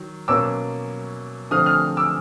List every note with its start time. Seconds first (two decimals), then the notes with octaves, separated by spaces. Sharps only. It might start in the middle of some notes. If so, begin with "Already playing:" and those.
Already playing: D#3 F#3
0.28 B2 F#3 A#3 C#4 D6 E6
1.51 D3 F3 A3 C4 D#6 F6
1.66 D#6 F6
1.97 D6 E6